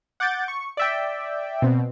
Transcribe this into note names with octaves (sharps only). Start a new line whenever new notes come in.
F#5 D6 G6 A6
C#6
D5 E5 G5
B2 C4